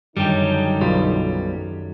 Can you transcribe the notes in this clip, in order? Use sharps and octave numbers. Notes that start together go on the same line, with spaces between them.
F#2 D3 D#3 G3 D#4 G4 A4
B1 B2 G3 F4